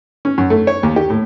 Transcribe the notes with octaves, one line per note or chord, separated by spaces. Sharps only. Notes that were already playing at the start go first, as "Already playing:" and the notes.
C#4
F#2
A3
C#5
D#2
G4
A2